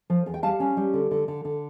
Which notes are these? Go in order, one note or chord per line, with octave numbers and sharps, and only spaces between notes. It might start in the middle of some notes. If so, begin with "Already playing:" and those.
F3
E2
G5
G3 F5 A5
C#4
G3
D3
D3
D3
D3